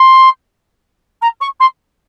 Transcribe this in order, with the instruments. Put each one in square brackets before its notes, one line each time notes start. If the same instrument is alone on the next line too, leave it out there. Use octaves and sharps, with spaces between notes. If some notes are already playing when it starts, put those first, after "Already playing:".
Already playing: [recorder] C6
A#5
C#6
C6